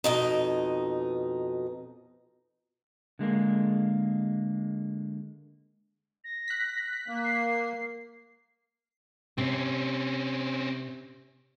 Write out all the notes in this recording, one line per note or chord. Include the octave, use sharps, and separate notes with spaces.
F2 B2 D#4
D3 G#3 A#3
A#6
F#6 B6
A#3
C7
C3 C4 C#4